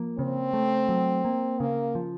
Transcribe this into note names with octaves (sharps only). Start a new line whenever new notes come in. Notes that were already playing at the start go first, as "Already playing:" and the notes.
Already playing: F3 A#3
C#3 C4
A3
F#3
A#3
C#3 A#3
F3